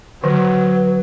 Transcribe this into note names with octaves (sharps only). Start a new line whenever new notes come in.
D3 F#3 B4